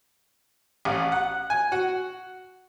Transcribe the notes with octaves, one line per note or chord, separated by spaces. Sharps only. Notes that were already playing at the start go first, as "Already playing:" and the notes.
A1
F#5
G#5
F#4